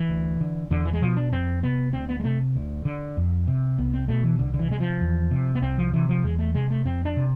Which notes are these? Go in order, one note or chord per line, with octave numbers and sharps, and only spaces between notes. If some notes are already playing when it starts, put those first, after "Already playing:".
Already playing: E3
D2
D3
E2 D3
E3
G#3
B2 F3
D4
F2 C4
C3 B3
D2 C4
B3
G#3
C3 A3
D2
D3
F2
C3
C2 B3
C4
B2 A3
E3
C2 D3
D3
E3
C3 G#3
F3
E2
C3
B3
C2 C4
F3
C3 E3
F3
E2 G#3
A3
C3 G#3
A3
F2 C4
D4
C3